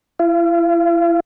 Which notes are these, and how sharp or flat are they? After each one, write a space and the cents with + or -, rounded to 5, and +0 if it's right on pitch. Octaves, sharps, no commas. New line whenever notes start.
E4 +35 F5 -35